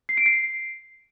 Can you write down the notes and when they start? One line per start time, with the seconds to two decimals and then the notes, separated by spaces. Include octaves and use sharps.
0.09 C7
0.17 D7
0.26 C7